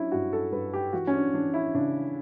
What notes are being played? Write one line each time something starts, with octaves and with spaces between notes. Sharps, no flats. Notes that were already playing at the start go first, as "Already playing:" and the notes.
Already playing: F#3 C#4 D4 E4
G2 F#4
A4
G2 B4
G4
E3 F#4
C#4
D4
E3 D4
E4
C#3 D4